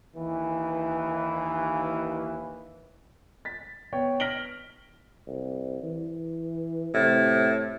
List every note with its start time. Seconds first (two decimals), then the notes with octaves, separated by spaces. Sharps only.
0.16 D#2 E3
3.45 A6 B6
3.93 B3 C#5 G5
4.20 F6 A#6 B6 D7 F#7 G7
5.27 C2
5.83 E3
6.94 A2 C3